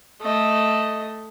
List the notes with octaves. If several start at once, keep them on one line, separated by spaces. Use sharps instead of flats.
A3 D#5